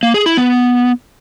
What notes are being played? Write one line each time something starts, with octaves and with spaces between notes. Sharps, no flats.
A#3
G#4
E4
B3